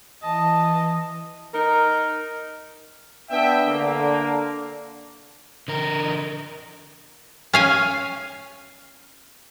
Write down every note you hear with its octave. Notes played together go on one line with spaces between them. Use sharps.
E3 D#5 A5
D#4 A#4
B3 D4 E5 G5
D3 A#3
D3 A#4
C#4 F5 G#5